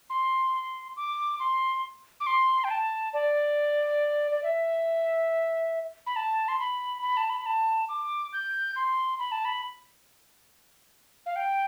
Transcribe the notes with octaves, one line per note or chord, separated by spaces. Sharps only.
C6
D6
C6
D6
C6
G5
A5
D5
D5
E5
B5
A5
C6
B5
B5
A5
B5
B5
A5
D6
G6
C6
B5
A5
B5
F5
G5